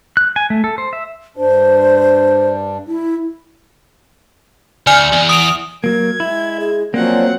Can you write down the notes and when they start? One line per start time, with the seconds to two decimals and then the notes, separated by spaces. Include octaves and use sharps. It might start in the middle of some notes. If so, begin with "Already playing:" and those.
0.17 F#6
0.36 G#5
0.50 A3
0.64 A4
0.78 C5
0.93 E5
1.37 G2 D4 C5
2.87 E4
4.87 D2 D5 G#5 F6
5.13 E2
5.29 D#6 D7 F7
5.84 F#3 A#3 A#4 G#6
6.20 G#3 E4 E5
6.60 G#4
6.94 F3 F#3 A#3 C4 C#4 D5 F#5